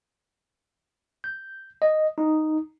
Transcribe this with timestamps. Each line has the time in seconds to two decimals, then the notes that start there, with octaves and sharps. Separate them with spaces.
1.24 G6
1.82 D#5
2.18 D#4